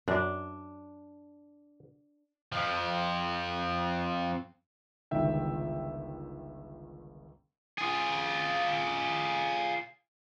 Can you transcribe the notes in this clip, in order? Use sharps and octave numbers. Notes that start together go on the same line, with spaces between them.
F#2 D4
F2 F3
G1 C#2 D#3 E5 G5
F4 G#4